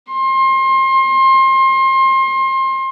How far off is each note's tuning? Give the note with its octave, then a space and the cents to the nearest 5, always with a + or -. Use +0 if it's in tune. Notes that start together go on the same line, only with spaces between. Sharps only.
C6 +30